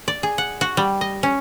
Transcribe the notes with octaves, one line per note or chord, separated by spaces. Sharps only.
D5
G#4
F#5
F#4
G3
D#5
C#4